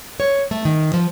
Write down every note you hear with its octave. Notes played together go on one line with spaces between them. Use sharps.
C#5
A3
D#3
F3